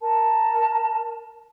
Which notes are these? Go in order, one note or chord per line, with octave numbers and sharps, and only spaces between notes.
A#4 A5